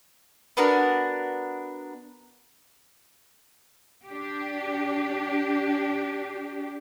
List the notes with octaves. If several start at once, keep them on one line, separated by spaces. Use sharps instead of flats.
B3 D4 F#4 A#4
D4 G4